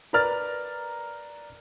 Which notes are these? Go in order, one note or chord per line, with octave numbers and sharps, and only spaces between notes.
A#4 B4 D5 A#5 F6 A6